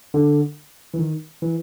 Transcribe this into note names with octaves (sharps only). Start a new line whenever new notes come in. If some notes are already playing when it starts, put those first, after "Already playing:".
D3
E3
D#3
E3